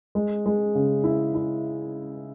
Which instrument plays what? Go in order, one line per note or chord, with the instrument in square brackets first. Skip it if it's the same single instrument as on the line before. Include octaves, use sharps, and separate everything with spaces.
[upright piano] G#3
G#3
C#3
E4
E4